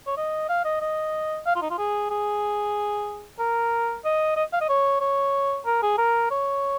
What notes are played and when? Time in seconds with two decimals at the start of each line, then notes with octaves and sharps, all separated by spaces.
0.07 C#5
0.17 D#5
0.49 F5
0.65 D#5
0.81 D#5
1.46 F5
1.56 F4
1.62 D#4
1.71 F4
1.78 G#4
2.10 G#4
3.39 A#4
4.05 D#5
4.36 D#5
4.53 F5
4.61 D#5
4.69 C#5
5.01 C#5
5.66 A#4
5.83 G#4
5.98 A#4
6.31 C#5